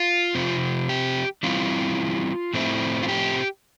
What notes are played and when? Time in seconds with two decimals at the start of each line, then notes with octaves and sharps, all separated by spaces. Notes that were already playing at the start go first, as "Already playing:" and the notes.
Already playing: F4
0.35 C3 F3 C4
0.89 G4
1.43 E3 G3 C4 E4 F4
2.54 A2 F3 A3 C4 E4
3.03 F4
3.08 G4